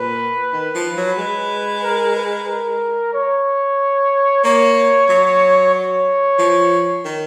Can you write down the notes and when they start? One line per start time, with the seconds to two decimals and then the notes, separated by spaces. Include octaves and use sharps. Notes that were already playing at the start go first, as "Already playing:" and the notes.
Already playing: A#2 B4
0.53 D#3
0.75 F3
0.97 F#3
1.18 G#3
1.83 A#4
2.16 B4
2.48 A#4
3.14 C#5
4.44 A#3 C#5
5.09 F#3
5.74 C#5
6.39 F3
7.05 D#3